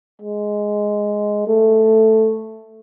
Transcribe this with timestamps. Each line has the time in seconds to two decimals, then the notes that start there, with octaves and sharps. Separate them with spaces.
0.22 G#3
1.48 A3